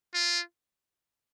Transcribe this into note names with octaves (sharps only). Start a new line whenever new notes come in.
F4